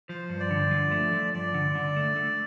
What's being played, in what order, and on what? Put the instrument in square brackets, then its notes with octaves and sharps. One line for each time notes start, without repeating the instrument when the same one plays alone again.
[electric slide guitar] F3 [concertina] C5
[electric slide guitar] G2
[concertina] D5
[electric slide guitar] D3
F3
A3
F3
[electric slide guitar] G2 [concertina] D5
[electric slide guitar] D3
D3
A3
A3